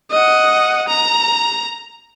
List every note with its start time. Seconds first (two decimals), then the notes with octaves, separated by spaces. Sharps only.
0.11 D#5 F#5
0.88 A#5